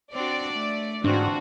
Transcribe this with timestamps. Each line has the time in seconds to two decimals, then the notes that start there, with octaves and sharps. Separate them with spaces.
0.13 C4 D4 F#4 D5
0.54 A3
1.04 G#2 E3 C4 D4 F4 F#4